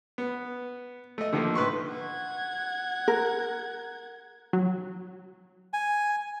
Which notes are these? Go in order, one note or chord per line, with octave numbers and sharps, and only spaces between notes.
B3
A3 D#5
D3 D#3 F3 A3 A#3
A2 B4 C6 C#6
F#5 G#6
A#4
F#3
G#5